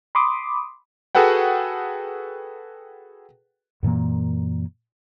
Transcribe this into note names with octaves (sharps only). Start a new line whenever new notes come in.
B5 C6 D6 D#6
F#4 G#4 A4 B4 F#5 G5
F#2 A#2 E3 A#3